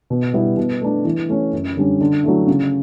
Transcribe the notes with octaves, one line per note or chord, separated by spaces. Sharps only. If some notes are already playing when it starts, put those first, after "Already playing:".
B2
G3 B3 E4
B2
A3 D4
E3
A3 C#4
F#2
D3 G3 C#4
D3
F#3 A3 E4
C#3